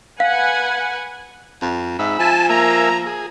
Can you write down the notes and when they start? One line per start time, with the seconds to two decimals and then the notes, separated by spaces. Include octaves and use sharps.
0.20 B4 F5 F#5 G#5
1.62 F2
1.99 G#2 E5 B5
2.19 F3 G#5 A5
2.49 A#3 E5 G#5 A#5
3.06 G#4